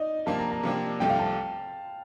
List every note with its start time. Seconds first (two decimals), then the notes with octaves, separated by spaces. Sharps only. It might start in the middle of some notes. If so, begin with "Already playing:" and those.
Already playing: D#4 D5 D#5
0.26 C3 F3 A#3 D4 A5
0.39 A#5
0.52 A#5
0.63 C3 F3 A#3 D4
1.00 C2 C3 F3 A3 G5
1.10 F5
1.19 A5